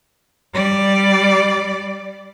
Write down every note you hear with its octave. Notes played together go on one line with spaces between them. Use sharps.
G3 D5